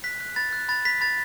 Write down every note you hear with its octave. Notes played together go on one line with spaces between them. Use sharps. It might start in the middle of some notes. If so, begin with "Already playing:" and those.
F#6 B6
F#6
B5 A6
F#6
B5 A6
B5 B6
B5 A6